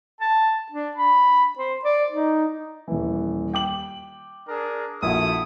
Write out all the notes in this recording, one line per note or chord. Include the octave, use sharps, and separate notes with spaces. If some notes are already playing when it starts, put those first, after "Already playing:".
A5
D4
B5
C5
D5
D#4
D#1 E3
G5 D6 F#7
D4 G#4 A#4
A#1 E4 F#4 A4 D#6